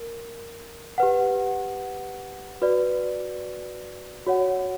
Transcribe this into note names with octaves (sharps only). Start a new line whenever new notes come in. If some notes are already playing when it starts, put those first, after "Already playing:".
Already playing: A#4
G4 B4 F#5
F#4 B4 D5
F#4 C#5 F#5